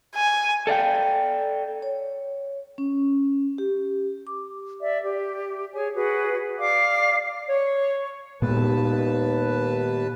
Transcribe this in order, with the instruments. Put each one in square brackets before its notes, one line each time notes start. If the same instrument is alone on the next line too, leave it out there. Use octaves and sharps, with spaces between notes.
[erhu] G#5
[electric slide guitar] A4 D5 F5 G5
[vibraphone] C#5
C#4
G4
D6
[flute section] D5 E5
G4
G#4 C#5 G#5
F#4 G#4 B4
D5 F5 D6
[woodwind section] C#5
[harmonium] D#2 B4 A5 [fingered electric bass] A#2 G#3 B3